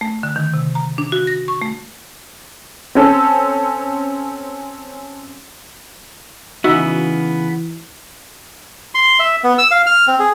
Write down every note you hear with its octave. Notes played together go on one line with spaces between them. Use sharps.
A3
D3
D#3
C3
A#5
D4
F#4
A#6
C#6
A3
C4 C#4 A4
C#3 E3 B3 D#4 F#4 E5
C6
E5
B3
E6
F5
F6
C4
G#4